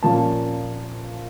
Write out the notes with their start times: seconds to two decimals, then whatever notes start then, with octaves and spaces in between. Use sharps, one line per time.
0.03 A#2 F3 A#3 C#4 F4 A5